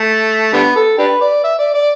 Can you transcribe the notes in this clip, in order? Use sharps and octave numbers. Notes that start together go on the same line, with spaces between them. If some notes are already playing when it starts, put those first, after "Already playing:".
Already playing: A3
D3 G3 B3
A4
D4 G4 B4
D5
E5
D5
D5